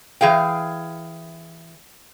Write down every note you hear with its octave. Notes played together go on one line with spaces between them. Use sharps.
E3 G#4 F5 G5